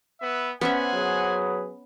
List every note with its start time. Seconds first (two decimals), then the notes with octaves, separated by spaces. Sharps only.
0.21 B3 B4 E5
0.61 B3 C#4 C5 E5 F#5 G#5
0.93 F#3 G#4 B4